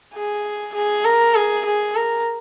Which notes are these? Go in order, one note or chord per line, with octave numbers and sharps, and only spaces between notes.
G#4
G#4
A#4
G#4
G#4
A#4